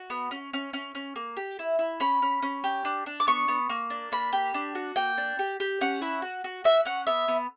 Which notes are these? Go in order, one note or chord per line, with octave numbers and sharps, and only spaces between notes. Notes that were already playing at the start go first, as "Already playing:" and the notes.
Already playing: F#4
B3
C#4
C#4
C#4
C#4
A#3
G4
E4
E4
C#4 B5
C#4
C#4
G4
D4
D4
D6
B3 C#6
B3
A#3
D4
A#3 B5
G4
D4
F#4
A#3 G5
D4
G4
G4
C#4 F#5
E4
F#4
F#4
F#4 E5
C#4 F#5
B3 E5
B3